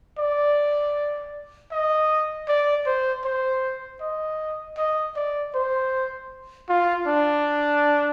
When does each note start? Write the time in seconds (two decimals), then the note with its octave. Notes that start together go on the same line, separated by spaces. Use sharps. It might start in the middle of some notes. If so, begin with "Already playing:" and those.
0.19 D5
1.72 D#5
2.48 D5
2.86 C5
3.25 C5
4.01 D#5
4.77 D#5
5.16 D5
5.54 C5
6.69 F4
7.07 D4